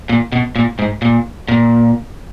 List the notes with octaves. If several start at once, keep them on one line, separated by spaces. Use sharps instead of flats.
A#2
B2
A#2
G#2
A#2
A#2